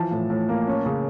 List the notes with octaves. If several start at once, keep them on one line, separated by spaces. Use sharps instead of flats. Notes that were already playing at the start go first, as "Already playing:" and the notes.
Already playing: E3 F3 A5
A2
A2
A#3
C#4
C#3